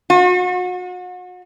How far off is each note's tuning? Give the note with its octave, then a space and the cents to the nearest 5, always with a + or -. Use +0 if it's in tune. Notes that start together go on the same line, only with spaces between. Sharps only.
F#4 -35